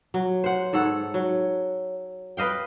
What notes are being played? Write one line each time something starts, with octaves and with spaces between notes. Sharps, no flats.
F#3
C5 F#5
G#2 A4 C#5 F#5
F#3
B4 D#5 F5 G5